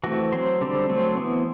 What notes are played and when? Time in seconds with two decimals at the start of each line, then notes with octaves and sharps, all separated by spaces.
0.04 E3 A3 C4 F#4
0.32 F#3 C4 C5
0.61 D3 G3 C4
0.89 F#3 A3 C4 C5
1.17 E3 B3